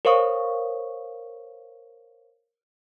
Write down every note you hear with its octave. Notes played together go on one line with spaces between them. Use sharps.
A#4 C5 C#5 F5 C#6 D#6